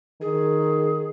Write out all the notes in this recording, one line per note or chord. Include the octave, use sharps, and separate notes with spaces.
D#3 G#4